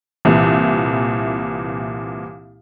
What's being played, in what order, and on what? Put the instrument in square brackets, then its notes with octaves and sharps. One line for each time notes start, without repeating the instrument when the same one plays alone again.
[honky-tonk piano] C2 A#2 E3